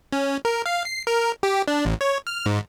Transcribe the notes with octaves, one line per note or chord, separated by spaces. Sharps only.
C#4
A#4
F5
C7
A#4
G4
D4
A1
C#5
F6
G#2